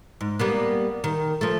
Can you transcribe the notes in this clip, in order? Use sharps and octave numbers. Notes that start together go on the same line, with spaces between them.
G#2
G3 A#3 B3
D#3
F3 A3